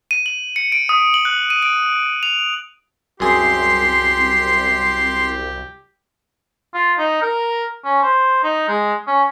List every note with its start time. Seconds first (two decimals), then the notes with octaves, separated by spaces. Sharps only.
0.11 D#7
0.26 F#7
0.56 C#7
0.72 D7
0.89 D#6
1.14 F#7
1.25 F#6
1.50 D#7
1.62 D7
2.23 F7
3.20 C2 F#2 G4 G#4 C6
6.74 F4
6.98 D#4
7.22 A#4
7.85 C#4
8.03 C5
8.43 D#4
8.68 G#3
9.07 C#4